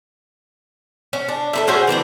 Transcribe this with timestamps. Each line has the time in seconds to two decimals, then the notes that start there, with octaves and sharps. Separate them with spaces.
1.13 C#4
1.29 D4
1.53 A4 B4 E5
1.67 C#4 F#4 G#4 C5
1.87 E3 A#3 C4 D4